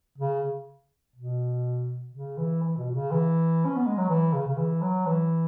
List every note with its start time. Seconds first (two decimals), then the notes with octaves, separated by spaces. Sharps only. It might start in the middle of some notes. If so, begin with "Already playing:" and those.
0.18 C#3
1.16 B2
2.14 C#3
2.38 E3
2.62 E3
2.78 B2
2.91 B2
2.95 C#3
3.11 E3
3.66 C#4
3.76 B3
3.87 G#3
3.98 F#3
4.09 E3
4.33 C#3
4.48 C#3
4.58 E3
4.82 F#3
5.06 E3